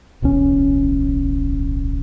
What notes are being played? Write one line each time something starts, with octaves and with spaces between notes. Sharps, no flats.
D1 B1 E2 C#4